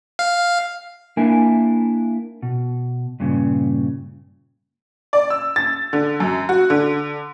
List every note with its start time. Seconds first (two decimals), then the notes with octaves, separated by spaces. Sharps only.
0.19 F5
1.17 A#3 D4 E4 A#4 G#5
2.42 B2
3.20 G2 A#2 C#3
5.13 D5
5.30 E6
5.56 A6
5.93 D3
6.20 F#2
6.49 F#4
6.70 D3